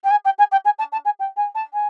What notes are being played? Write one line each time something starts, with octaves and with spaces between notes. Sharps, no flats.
G5
G#5
G5
G#5
G5
G#5
A5
A5
G#5
G5
G#5
A5
G#5